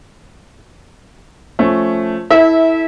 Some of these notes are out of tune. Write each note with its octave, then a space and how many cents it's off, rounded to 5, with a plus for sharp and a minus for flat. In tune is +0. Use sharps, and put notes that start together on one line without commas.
F3 +0 A3 +0 C#4 +0
E4 -15 A4 +0 E5 -25